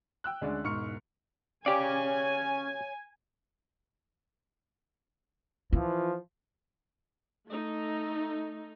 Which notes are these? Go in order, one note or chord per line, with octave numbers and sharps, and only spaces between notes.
G5 E6 F#6
D2 G#3 C#4 D4 D5
E1 G#2 C#6 F6 C#7
C#4 G4 C#5 D5 F5 G#5
E3 F3 F4
A3 D#4